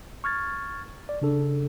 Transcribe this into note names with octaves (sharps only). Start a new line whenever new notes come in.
C#6 F6 G#6 A6
D5
C#3 D4 A4